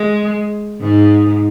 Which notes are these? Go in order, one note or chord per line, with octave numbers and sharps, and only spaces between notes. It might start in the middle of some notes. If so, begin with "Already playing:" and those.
Already playing: G#3
G#2